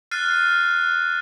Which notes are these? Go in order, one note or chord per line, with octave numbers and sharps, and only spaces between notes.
F6 F#6 A6 C7 D#7